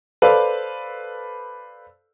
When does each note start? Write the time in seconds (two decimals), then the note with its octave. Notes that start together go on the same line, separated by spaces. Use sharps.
0.22 A4 B4 C5 D5 F5